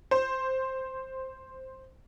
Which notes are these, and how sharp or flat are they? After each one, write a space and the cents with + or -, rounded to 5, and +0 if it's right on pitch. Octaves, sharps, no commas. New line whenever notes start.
C5 +5